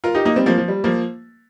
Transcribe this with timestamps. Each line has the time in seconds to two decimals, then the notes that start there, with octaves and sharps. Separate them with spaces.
0.04 F4 A#4
0.15 D#4 G4
0.25 A#3 D#4
0.36 G3 C4
0.46 F3 A#3
0.58 F3
0.68 G3
0.84 F3 A#3